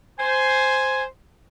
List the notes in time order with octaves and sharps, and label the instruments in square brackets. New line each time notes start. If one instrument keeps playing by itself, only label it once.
[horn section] C5 [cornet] G#5